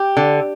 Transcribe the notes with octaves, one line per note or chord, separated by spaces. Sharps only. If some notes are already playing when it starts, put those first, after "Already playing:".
Already playing: G4
D3